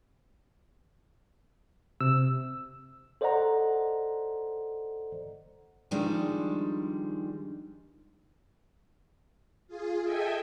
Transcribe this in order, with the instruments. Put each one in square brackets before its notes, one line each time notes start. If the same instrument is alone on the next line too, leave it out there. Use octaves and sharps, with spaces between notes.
[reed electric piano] C3 [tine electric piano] E6
[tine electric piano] A4 C5 D5 D#5 F#5 A#5
[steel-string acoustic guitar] D#3 F3 G3 G#3 D4
[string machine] F4 G#4
A4 D#5 E5 G5 G#5